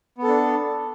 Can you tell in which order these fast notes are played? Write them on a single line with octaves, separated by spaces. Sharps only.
B3 A4 D4